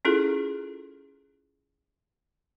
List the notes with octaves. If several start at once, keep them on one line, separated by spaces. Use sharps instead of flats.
C#4 E4 F4 G#4 A4